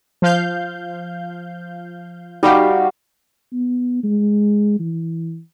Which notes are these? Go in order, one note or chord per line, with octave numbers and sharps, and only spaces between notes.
F3 F5 G6
G3 D#4 F#4 G4 F5
B3
G#3
E3